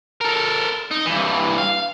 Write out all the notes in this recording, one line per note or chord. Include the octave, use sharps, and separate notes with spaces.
A4 A#4
D#4
G2 E3
F5